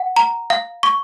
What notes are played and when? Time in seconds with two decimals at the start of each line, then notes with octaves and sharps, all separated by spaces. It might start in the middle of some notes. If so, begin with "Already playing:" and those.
Already playing: F#5
0.16 A#5
0.50 F5
0.83 C#6